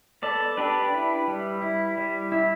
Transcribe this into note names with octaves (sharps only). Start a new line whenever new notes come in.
B3 A4 D5
D4 G4 B4
E4
G3
E4
G3
E4